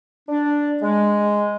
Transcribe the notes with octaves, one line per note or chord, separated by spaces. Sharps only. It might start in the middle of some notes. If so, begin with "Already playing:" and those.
D4
G#3